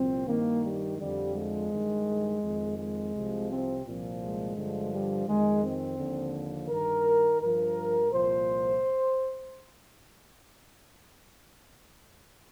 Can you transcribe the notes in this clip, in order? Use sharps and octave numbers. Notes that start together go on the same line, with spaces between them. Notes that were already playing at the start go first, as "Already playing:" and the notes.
Already playing: C2 A#2 F3 C4
G2 D#3 A#3
G3
F2 D3 F3 G3
G#3
G2 D#3
F2 D#3
G#3
C2 C3 F3
C4
C2 A#2 F3
G#3
G2 D3 F3
G3
F2 D#3 G#3
C4
D#2 D3 F3
G2 D#3 A#4
G2 F3 A#4
C2 A#2 F3 C5